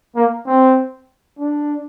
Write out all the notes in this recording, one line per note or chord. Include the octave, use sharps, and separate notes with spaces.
A#3
C4
D4